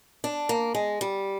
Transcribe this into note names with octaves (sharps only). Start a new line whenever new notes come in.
D4
A#3
G#3
G3